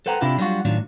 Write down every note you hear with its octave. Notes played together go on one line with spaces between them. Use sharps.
A4 B4 C5 F#5 G5 A#5
C3 D4 E4 F4 G4
F#3 G3 B3 D4 F4 F#4
A2 D#3 F#3 D4 F4